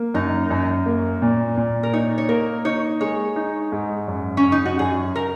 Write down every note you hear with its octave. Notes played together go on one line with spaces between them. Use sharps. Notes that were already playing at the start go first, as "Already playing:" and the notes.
Already playing: A#3
F#2 D#4
F#2
A#3
A#2
A#2
A#4
D#4 C#5
C#5
A#3 A#4
D#4 C#5
G#3 C#5
D#4
G#2
F#2
C#4
F#2
D#4
F#4
F#2 G#4
A#4